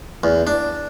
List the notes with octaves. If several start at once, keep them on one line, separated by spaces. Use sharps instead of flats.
E2
D4